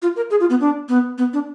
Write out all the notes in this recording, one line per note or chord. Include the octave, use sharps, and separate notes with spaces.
F4
A#4
G#4
F4
B3
D4
B3
B3
D4